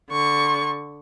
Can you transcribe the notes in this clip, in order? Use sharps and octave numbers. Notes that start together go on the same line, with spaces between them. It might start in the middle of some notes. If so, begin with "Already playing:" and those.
D3 C#6